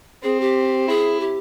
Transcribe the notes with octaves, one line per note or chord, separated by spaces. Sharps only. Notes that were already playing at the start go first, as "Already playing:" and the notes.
C4 G#4
G4
E4 G#4
G4